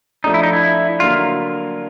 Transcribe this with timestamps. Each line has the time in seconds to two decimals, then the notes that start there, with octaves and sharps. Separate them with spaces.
0.24 F3 A3 D4 D#4
0.34 E4
0.43 D#4
0.53 E4
1.00 D3 F#3 A#3 F4